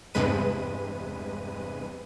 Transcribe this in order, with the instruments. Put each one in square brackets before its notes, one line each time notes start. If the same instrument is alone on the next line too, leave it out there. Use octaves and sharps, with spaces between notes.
[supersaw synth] E2 G2 C3 G#3 B4 D#7